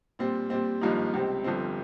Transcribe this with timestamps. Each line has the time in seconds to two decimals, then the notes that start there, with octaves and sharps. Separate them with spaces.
0.19 A#2 G3 C4
0.50 A#2 G3 C4
0.81 G#1 G2 F3 A#3 D#4
1.14 C#2 C3 G3 C4
1.44 G1 G2 F3 C4